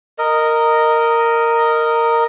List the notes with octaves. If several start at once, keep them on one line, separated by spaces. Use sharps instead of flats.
A#4 D#5